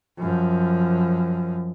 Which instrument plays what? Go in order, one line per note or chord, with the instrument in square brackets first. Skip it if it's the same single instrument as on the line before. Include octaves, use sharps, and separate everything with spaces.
[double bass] F#2 F3